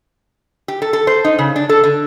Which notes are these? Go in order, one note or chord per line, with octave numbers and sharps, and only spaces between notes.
G4
A4
A4
C5
D#4
C#3
D4
A4
D3